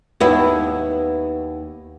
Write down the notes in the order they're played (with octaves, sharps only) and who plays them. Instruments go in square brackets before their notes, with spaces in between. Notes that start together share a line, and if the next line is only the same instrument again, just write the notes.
[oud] D#2 B3 E4